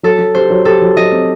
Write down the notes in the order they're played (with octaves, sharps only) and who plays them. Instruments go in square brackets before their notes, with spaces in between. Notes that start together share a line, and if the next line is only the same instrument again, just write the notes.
[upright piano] F#3 [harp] A4
[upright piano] F#3
[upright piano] G4 [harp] C5
[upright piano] F#3
[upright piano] G4 [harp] A4
[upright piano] F#3
[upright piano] F#3 [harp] D#5
[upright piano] C4